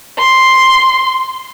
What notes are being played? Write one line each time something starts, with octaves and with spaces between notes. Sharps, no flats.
C6